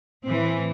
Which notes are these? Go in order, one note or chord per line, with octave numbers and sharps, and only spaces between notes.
A2 E3 C4